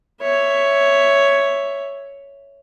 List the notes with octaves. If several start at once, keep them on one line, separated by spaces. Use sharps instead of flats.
C#5 E5